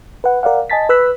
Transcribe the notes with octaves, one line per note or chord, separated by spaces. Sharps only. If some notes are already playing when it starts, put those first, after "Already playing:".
B4 F#5
A#4 D5 F5 F#5
D#5 G#5 A5 A6 B6
B4 E6 F#6 B6